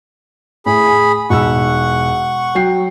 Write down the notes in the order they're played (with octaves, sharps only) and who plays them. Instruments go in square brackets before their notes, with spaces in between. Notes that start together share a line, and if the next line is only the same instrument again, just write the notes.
[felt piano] A2 [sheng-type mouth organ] G#4 B5
[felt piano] G#5
[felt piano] E1 D#4 E6 [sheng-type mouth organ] F#5 C#6
[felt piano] F#3 G5 C7